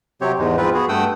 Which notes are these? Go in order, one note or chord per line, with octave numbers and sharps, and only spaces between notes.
C3 F#3 C4 G4 C#5
E2 G#2 G#3
G#2 F3 C4 F4 B4
B3 F#4 G#4
G2 A3 F#5 G5 D#6 E6